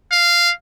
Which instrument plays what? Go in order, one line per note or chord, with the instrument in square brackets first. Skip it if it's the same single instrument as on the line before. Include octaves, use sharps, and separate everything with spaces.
[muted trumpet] F5